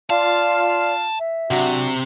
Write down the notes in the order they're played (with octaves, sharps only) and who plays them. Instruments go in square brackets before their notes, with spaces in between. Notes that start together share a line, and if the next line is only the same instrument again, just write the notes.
[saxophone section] F4 F5 [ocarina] D5 [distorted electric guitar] A5
[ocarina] E5
[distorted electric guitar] C3 [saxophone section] F#3 D4 F#4